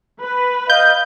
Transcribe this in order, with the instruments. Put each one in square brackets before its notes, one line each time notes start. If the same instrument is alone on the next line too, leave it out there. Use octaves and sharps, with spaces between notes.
[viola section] B4
[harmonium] D#5 F5 [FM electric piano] G6